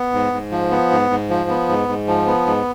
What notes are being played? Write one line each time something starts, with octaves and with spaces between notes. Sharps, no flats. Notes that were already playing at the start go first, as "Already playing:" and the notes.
Already playing: B3
G#2
G#2
F3
B3
G#2
G#2
F3
B3
G#2
G#2
F3
B3
G#2